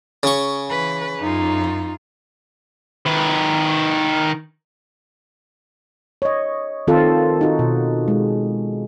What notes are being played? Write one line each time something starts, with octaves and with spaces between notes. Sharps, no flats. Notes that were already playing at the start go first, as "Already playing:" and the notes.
C#3 C#6
E3 B4
F#2 D#4 F4
D#3 B4
C#5 D#5
D#3 C4 F4 A4
D#4 F#4
B2
G#3